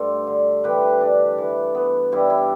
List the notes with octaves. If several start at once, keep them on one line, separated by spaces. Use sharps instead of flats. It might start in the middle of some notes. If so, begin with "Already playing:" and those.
Already playing: G2 A3 A4 C5
D3
E3 G4 B4
D4
E3
B3
G2 E4 G4
E4